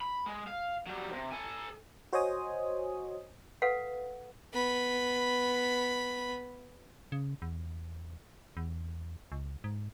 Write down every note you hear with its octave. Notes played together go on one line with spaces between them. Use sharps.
B5
G#3
F5
F#3 G3
D#2 C3
A4 G#5
F#4 C5 C#5 D#5 G#5 D#6
A4 B4 F5 F#5
B3 B5
C#3
E2
E2
C#2
G#2